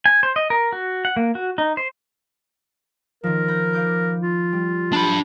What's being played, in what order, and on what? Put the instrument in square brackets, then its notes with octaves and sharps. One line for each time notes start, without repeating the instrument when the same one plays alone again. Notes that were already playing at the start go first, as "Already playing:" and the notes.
[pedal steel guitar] G#5
C5
D#5
A#4
F#4
F#5
A#3
F#4
D#4
C5
[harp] D#3 F3 [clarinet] A#4
[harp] B5 G6 A#6
F5 D6 G6
[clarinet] F4
[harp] G3
[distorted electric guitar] D4 B5